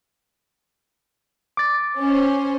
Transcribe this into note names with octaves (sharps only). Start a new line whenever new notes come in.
D6 A6
C#4 C5